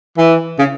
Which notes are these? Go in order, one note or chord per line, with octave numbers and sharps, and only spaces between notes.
E3
C#3